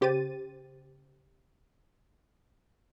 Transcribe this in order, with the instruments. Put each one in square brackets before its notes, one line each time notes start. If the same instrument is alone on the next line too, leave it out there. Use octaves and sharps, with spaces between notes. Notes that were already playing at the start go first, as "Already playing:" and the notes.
[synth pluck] C#3 G4 C5 A6 D#7